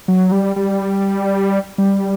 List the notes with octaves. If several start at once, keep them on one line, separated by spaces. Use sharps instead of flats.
F#3
G3
G3
G3